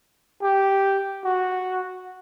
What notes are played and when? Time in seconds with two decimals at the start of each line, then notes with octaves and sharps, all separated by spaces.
0.43 G4
1.25 F#4